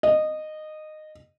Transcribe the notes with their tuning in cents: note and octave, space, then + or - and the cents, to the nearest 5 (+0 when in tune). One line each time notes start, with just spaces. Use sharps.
D#5 -15